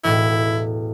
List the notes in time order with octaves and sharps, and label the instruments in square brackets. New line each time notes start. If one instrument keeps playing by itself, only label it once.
[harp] E1 A2 [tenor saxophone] E4